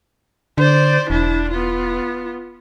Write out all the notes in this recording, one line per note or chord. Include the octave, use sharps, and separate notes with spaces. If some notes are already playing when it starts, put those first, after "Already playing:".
D3 C5 D5
E1 D4 E4
B3 F4